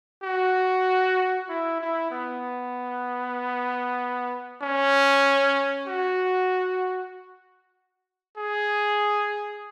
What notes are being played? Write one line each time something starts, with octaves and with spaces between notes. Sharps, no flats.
F#4
E4
E4
B3
C#4
F#4
G#4